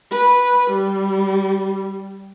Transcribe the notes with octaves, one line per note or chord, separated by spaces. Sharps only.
B4
G3